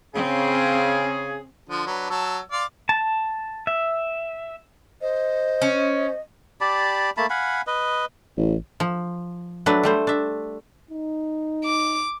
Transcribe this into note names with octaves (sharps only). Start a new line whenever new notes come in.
C#3 C4 G#4
D3 F3
F#3 D4 B4
F#3 A5 E6
D5 F5 C6
A5
E5
C5 D#5
C#4
G4 D5 A5 B5
A3 A#3 A5 B5
F5 F#5 G#5 B5
B4 D#5
A1
F3
F#3 A3 D4 B4
G3 A3 C5
D4 E5
D#4
D6